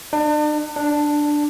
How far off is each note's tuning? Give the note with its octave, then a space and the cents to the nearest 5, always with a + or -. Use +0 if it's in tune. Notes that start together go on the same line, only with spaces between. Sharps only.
D4 +40
D4 +5